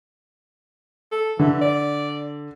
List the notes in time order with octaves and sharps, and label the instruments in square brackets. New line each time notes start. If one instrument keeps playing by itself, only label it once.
[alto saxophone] A4
[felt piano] D3 [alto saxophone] E3
[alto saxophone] D5